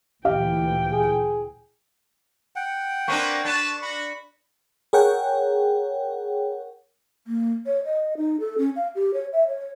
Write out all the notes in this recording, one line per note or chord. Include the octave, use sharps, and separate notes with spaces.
D2 A#2 E3 G4 F5 G5
G#4
F#5 G5
A#3 C4 D4 B4 C#6
D4 B4 A5
F#4 B5
G#4 A#4 C#5 F#5 G5
A#3
C#5
D#5
D#4
A4
C#4
F5
G4
C#5
E5
C#5